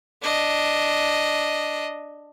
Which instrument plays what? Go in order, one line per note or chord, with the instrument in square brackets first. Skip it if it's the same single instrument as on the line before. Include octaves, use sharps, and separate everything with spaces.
[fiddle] D4 D#5